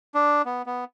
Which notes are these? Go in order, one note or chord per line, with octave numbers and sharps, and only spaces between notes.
D4
B3
B3